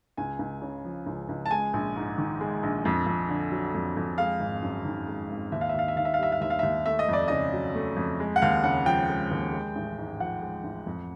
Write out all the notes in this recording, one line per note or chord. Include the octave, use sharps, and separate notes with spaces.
C#2 G#5
C#2
C#3
F3
C#2
C#2
A5
G#3 G#5
A#1
G#2
D#3
G#3
A#1
F2
F2
D3
F#3
F2
F2
G#3 F5
G#1
F#2
D#3
G#3
G#1
D#2 E5
F5
E5
D#2 F5
E5
D#3 F5
E5
F5
G3 E5
F5
D#2 E5
F5
D#2 E5
A3 E5
D#5
F2 D5
C#3 D#5
F#3
A3
F2
G#3
F#5
D#2 F5
C#3 F#5
F3 G5
G#3
D#2
G#3
A1
G#2
F3 F#5
G#3
A1
F2